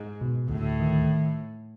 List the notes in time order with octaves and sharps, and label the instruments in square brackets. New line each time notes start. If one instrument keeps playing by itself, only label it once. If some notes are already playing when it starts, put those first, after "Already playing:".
Already playing: [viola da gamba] G#2
[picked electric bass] B2
[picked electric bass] D2 [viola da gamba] A2
[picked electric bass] D#3